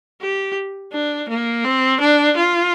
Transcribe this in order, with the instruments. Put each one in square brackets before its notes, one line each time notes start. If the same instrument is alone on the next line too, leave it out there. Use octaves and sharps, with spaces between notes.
[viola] G4
D4
A#3
C4
D4
F4